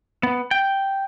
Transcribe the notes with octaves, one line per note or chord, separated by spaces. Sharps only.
B3
G5